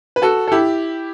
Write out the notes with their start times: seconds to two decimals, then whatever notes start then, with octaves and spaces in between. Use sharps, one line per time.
0.16 B4
0.22 F#4 A4
0.48 A4
0.52 E4 G4